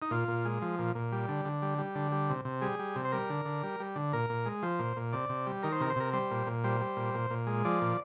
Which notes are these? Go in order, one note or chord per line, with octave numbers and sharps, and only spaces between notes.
D#4
A#2 F4
A#2
G#3
F3
A#2
A#2
G3
D3
D3
G3
G3
D3
G3
C3
C3
G3 G#4
G3
C3
C5
G3 A#4
D3
D3
G3
G3
D3
A#2 A#4
A#2
G#3
F3 C5
A#2
A#2
C3 D5
C3
G3
D#3 A#4
C5
C3 A#4
C5
C3 A#4
G3 C5
A#2
A#2
G3 C5
G3
A#2
A#2
A#2
G#3
F3 D5
A#2